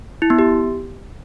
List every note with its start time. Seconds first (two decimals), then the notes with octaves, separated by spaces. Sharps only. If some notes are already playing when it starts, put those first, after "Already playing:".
0.22 E4
0.30 B3
0.39 G4